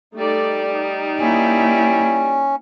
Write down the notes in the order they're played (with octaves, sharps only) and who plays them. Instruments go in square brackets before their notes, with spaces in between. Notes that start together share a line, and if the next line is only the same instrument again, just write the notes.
[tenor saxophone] G3 [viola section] A3 D#4 D5
[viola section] D#4
[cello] A#3 E4 [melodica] C#4